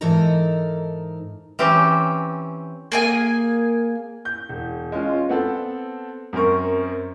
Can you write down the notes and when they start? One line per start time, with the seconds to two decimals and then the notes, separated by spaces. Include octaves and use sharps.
0.01 G#2 E3 D#4 A4 A#4 A#5
1.59 E3 C4 C#4 G4
2.92 A#3 G#4 G#5
4.25 G6
4.49 E1
4.92 G#3 C#4 F4
5.29 B3 C4 A4
6.33 F#2 C4 A#4 C#6